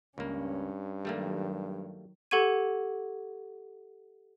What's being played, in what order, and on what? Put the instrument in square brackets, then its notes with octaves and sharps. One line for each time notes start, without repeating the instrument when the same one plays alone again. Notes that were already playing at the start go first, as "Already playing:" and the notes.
[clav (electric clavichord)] C#2 A#3 [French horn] G2 [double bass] C#4
[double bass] D#3 F#3 [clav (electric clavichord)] G3 A3 A#3
[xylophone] G4 A4 F#5 C#6 G#6 D#7